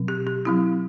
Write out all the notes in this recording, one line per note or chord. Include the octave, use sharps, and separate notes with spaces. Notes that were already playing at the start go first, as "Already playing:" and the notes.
Already playing: B2 F#3 C4
G4
G4
F#3 C4 E4